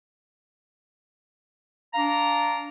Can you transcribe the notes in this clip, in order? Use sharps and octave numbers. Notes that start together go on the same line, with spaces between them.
D4 F5 A#5